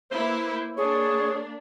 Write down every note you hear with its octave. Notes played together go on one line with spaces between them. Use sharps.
A#3 E4 B4 C5
A#3 D4 G#4 C#5